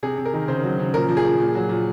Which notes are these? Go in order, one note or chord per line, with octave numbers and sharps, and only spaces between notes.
C3 G#4
C3
A#4
D#3
C#3 C5
F#3
C#3
A#2 A#4
F3
G#4
F3
A#2
F#3
A#2